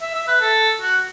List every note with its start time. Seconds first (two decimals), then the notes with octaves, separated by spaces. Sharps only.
0.01 E5
0.14 E5
0.28 B4
0.41 A4
0.81 F#4